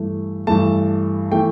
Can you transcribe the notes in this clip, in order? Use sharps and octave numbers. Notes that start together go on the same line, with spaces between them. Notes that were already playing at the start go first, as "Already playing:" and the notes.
Already playing: G2 E3 A3
G2 E3 A3 A5
E3 A3 G5